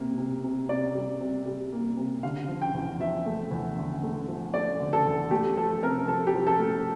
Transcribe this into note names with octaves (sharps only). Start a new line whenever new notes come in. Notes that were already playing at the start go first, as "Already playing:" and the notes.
Already playing: C3 A#3
C3
C3
C3 D5
G3
C3
G3
A#3
C3
D3 F5
F3
G5
E2
F3 E5
A3
E2
D3
A3
F3
A3 D5
D3
A4
E2
A3 G4
F3 A4
C3 A#4
F3 A4
G4
F3
A4
A3